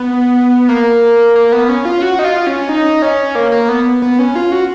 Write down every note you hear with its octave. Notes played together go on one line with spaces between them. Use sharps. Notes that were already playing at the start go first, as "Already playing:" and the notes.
Already playing: B3
A#3
A#3
B3
C#4
F4
F#4
D#4
F4
C#4
D#4
C#4
A#3
A#3
B3
B3
C#4
F4
F#4